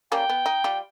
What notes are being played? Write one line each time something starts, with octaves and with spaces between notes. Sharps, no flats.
G3 A#3 C#4 G5
B3
D#4
G3 F4